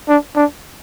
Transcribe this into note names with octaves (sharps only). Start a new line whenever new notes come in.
D4
D4